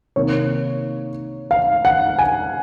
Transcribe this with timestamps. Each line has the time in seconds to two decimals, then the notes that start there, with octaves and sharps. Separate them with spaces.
0.16 C3 D#3 A#3 C#5
1.51 F5
1.85 F#5
2.19 G#5